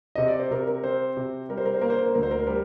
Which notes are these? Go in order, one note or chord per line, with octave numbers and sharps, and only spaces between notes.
C3 D#5
D5
C5
C3 A#4
A#4
C4 C5
C3
G3 A#4
C5
A#4
C5
A#3 A#4
C5
A#4
C5
D2 A#4
C5
A#4
C5
G3 A#4